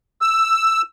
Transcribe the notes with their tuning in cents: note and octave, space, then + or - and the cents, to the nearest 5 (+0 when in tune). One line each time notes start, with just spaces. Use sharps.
E6 +5